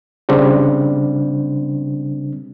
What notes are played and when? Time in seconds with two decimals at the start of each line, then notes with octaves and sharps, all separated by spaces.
0.29 C#3 G3 C4 D4